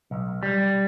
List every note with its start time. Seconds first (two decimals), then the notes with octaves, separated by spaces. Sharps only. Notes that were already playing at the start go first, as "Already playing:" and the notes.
0.11 B1
0.43 G3